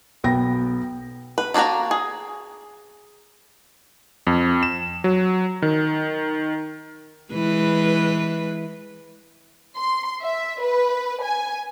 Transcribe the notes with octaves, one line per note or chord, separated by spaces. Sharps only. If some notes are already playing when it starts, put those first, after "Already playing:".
B1 B3 G5 A#6
B4
D#3 A#3 D4 F#4 A#5
G#4
F2
E7
F#3
D#3
E3 G#3 B4
C6
E5
B4
G#5